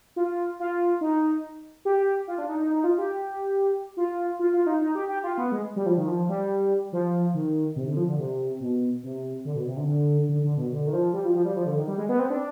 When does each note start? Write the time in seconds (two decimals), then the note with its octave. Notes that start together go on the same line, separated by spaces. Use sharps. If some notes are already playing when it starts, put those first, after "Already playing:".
0.16 F4
0.60 F4
1.01 D#4
1.85 G4
2.27 F4
2.38 D4
2.49 D#4
2.60 D#4
2.70 D#4
2.84 F4
2.98 G4
3.97 F4
4.39 F4
4.53 F4
4.66 D#4
4.82 D#4
4.95 G4
5.09 G4
5.23 F4
5.38 B3
5.52 G#3
5.76 G3
5.86 F3
5.98 D#3
6.07 F3
6.29 G3
6.93 F3
7.34 D#3
7.76 C3
7.87 D3
7.97 F3
8.08 D3
8.19 C3
8.60 B2
9.03 C3
9.45 D3
9.56 B2
9.67 C3
9.77 D3
9.88 D3
10.29 D3
10.44 D3
10.57 B2
10.72 D3
10.87 D#3
10.93 F3
11.13 G3
11.25 F3
11.35 F3
11.45 G3
11.56 F3
11.66 D3
11.77 D#3
11.88 G3
11.98 G#3
12.09 B3
12.19 C4
12.30 D4